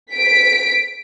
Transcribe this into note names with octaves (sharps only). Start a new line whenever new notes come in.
B6 D7